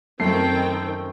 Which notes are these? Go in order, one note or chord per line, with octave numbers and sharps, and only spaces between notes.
F#2 D#3 A3 C4 G5 C7